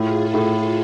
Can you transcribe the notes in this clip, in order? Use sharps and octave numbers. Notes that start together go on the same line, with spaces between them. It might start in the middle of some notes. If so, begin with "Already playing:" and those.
Already playing: A2 F4 G#4
A4
A2